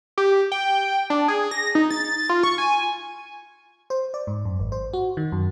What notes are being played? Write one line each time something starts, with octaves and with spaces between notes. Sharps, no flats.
G4
G5
D4
G#4
A#6
D#4
A6
F4
C#6
G#5
C5
D5
G#2
F#2
G#1
C5
F#4
D#3
F#2